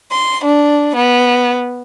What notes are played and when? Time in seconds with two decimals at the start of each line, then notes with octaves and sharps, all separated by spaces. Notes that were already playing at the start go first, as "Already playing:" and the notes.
0.12 C6
0.44 D4
0.96 B3